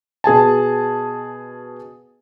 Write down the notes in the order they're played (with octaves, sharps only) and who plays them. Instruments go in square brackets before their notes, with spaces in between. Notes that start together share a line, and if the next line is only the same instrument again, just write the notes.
[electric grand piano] B2 G#4 G#5 A5